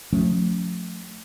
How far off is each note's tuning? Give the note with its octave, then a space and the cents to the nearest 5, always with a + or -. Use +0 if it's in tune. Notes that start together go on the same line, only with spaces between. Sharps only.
F3 +40 A3 +0 C#4 +0